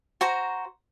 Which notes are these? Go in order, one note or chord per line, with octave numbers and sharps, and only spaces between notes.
F#4 C5 A#5